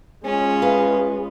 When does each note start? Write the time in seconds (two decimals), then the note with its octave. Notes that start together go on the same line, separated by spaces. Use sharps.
0.25 G#3 C#4 F4
0.62 B4 F5